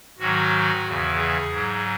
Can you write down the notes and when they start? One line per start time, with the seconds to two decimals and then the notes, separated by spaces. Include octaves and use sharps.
0.19 G#2 D#3 F#3 F#4
0.85 E2 C#3 E3
1.18 G#4
1.51 G#2 F#3